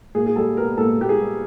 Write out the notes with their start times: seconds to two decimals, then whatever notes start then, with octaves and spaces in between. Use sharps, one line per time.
0.15 A#2 G#4
0.26 G#4
0.36 G3 A4
0.56 B3 A#4
0.77 A#2 A4
0.98 A#2 G4
1.09 G#4
1.19 G3